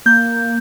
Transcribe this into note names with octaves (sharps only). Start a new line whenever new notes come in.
A#3 G6